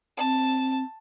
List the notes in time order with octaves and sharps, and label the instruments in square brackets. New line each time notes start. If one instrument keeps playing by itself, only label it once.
[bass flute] C4 [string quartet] A5